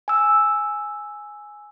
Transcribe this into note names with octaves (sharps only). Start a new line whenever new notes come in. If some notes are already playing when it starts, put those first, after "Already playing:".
G#5 E6